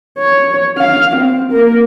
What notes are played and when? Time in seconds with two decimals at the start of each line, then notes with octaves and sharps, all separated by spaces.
0.18 C#5
0.78 F5
1.16 C4
1.52 A#3 A#4